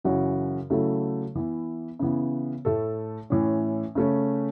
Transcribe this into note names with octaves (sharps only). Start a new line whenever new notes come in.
F#2 C#3 E3 C#4 F#4
C#3 F#3 A3 E4 A4
E3 B3 E4
C#3 E3 B3
A2 A3 E4 A4
A2 E3 C#4
C#3 A3 C#4